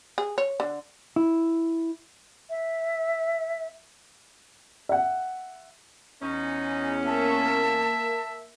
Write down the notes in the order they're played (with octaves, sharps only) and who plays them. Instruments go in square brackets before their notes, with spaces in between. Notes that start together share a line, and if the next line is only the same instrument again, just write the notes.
[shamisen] G#4
C#5
D3
[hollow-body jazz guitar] E4
[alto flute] E5
[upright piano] E5 F#5
[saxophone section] E2 C#4 [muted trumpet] D#4
[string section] A#3 [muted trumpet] E5 [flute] A5